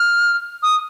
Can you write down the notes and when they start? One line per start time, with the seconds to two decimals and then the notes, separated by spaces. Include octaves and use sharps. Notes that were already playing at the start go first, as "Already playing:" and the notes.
Already playing: F6
0.63 D#6